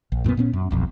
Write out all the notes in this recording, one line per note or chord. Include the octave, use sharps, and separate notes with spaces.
A#1
F#2 A#2 E3 B3
A#2 B3 C#4
F#2
D#1 B1 F2